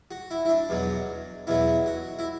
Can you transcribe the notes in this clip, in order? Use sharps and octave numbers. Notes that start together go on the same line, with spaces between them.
F#4
E4
E4
D4
E2 B2 F#3
E2 B2 F#3 E4
F#4
E4